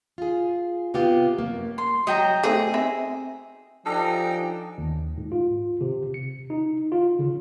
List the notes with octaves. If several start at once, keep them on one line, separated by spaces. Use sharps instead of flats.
F4 G#4
C3 B3 F4 G4
F#2 A#3
C6
F#3 D#5 G5 A#5
A3 C4 D#4 G#4
C4 E5
F3 D4 D#4 G4 A4 D#5 G5 G#5
D#2
G#2
F4
C3
C#7
D#4
F4
C#3